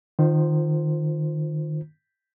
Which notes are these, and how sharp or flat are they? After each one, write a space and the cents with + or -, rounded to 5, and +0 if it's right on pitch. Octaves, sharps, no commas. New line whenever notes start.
D#3 -25 F4 +0 C5 +0